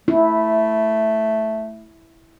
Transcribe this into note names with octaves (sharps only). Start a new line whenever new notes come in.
A3 E4